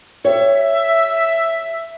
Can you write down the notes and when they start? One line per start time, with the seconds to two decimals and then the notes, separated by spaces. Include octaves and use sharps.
0.24 G4 C#5 E5